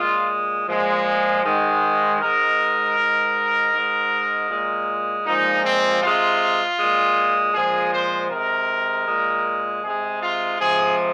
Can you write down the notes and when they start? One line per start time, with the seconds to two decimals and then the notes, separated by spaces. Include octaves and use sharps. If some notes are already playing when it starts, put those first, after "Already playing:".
Already playing: A#2 G#3 F4
0.67 A#2 F3 G#3
1.43 G#2 D#3 G#3
2.20 G#2 G#3 A#4
2.97 G#2 G#3
3.73 G#2 G#3
4.49 A#2 G#3
5.25 A#2 F3 G#3 D#4
5.64 C4
6.01 C3 G#3 F4
6.78 G#3
6.83 A#2
7.54 A#2 F3 G#3 G#4
7.92 C5
8.30 C3 G#3 A#4
9.07 A#2 G#3
9.83 C3 G#3 G#4
10.22 F4
10.59 C3 F3 G#3 G#4